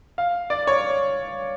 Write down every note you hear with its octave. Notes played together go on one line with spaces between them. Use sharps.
F5
D5
C#5